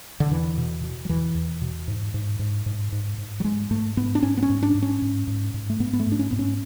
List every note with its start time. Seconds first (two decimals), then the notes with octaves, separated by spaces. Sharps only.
0.20 D3
0.31 E2 E3
0.58 B2
0.83 B2
1.05 F#3
1.09 E2 E3
1.35 E2
1.62 B2
1.88 G#2
2.14 G#2
2.39 G#2
2.66 G#2
2.92 G#2
3.18 G#2
3.40 F#3
3.44 G#2 G#3
3.71 G#2 A3
3.97 G#2 B3
4.15 D4
4.23 G#2 C#4
4.37 B3
4.42 C#4
4.50 G#2
4.63 D4
4.75 G#2
4.82 C#4
5.02 G#2
5.27 G#2
5.54 G#2
5.70 A3
5.80 G#2 B3
5.93 B3
6.00 A3
6.07 G#2
6.12 D4
6.19 C#4
6.31 G#2 B3
6.39 C#4